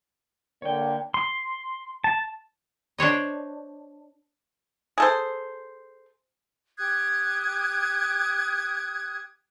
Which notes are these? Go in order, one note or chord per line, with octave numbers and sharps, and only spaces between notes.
D3 A#3 C#5 D5 G5
C6
A5
D4 C5 C#5 D#5
G#4 A4 C5
G4 D#6 F#6 G#6